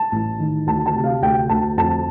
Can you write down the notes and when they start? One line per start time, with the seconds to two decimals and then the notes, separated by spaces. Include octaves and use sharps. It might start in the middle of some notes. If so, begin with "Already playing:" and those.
Already playing: A5
0.12 A1
0.39 D#3
0.67 D2 A5
0.86 A5
0.94 C3
1.04 F5
1.22 D2 G5
1.49 D2 A5
1.77 F2 A5